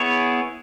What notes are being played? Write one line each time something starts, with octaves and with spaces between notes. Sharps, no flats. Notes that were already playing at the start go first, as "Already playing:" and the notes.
Already playing: B3 E4 G#4 C#5